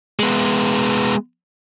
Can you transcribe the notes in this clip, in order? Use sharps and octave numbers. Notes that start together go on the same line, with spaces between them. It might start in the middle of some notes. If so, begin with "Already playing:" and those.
G#3 B3